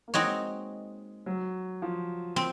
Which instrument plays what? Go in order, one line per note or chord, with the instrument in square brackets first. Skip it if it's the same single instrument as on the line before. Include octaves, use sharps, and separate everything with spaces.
[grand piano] A#3
[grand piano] G#3 [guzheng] C4 D#4 F#4 C#5
[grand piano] F#3
F3
[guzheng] C4